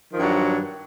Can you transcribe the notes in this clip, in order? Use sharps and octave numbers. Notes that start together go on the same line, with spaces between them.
G2 D#3 F3 F#3